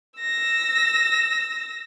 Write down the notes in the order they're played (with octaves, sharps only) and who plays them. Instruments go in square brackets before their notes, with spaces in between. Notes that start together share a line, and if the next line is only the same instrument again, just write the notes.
[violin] E6 A#6